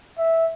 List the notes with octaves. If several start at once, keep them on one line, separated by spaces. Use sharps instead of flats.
E5